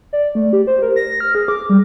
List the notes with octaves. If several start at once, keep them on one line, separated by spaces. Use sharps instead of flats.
D5
A3
G4
C5
A#4
A#6
F6
G#4
D6
G3